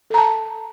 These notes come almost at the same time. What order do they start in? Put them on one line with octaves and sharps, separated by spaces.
A4 A#5 A5